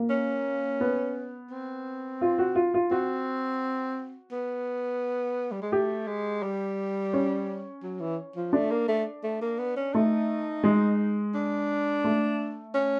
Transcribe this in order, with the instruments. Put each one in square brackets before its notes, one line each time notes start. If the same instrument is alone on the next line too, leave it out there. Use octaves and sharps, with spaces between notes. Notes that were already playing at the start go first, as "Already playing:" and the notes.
Already playing: [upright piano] A#3
[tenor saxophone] C#4
[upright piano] B3
[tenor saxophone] C4
[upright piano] F4
F#4
F4
F4
[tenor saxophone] C4 [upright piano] F#4
[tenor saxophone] B3
G3
G#3
[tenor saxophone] A3 [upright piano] G4
[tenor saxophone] G#3
G3
[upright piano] C#4
[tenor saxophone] F#3
E3
F3
[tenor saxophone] A3 [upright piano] D4
[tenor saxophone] A#3
A3
A3
A#3
B3
C#4
[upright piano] A3 [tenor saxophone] D#4
[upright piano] G#3
[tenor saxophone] D4
[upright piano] A3
[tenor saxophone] C#4